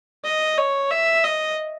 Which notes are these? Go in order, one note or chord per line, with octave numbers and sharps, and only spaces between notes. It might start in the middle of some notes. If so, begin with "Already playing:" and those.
D#5
C#5
E5
D#5